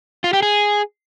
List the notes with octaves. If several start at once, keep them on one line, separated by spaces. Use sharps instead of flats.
F4
G4
G#4